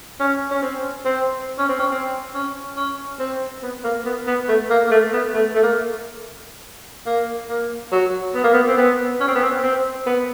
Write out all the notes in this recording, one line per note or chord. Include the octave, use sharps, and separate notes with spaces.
C#4
C#4
C4
C4
C#4
C4
C#4
C4
C#4
C#4
C4
B3
A#3
B3
B3
A3
A#3
A#3
A3
B3
A3
A3
A#3
A#3
A#3
F#3
B3
A#3
B3
C4
B3
C#4
C4
B3
C4
C4
B3